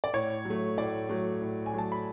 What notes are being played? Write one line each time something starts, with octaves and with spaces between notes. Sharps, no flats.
D5
A2 C#5
F#3
A3
A2 D5
F#3 A3
A2
G#5
F#3 A3 A5
B5